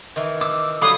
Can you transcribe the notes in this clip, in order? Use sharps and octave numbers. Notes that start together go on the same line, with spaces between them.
D#3 E3
D6 E6
D3 F#3 G3 F5 B5 D6 D#6